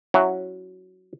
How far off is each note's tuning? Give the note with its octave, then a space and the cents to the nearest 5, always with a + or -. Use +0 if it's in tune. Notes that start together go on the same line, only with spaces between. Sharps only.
F#3 +0 C#4 +0 E4 +0